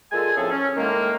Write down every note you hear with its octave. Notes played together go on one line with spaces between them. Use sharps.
A#2 G#3 A4 G#5
A2 C#3 F3 C4 G#4 A4
C#4
A2 D#3 G#3 A#3